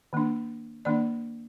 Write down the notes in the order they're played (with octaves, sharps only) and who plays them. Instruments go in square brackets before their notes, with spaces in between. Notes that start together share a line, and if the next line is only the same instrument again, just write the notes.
[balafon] D#3 A#3 D4
D#3 A#3 D4 D5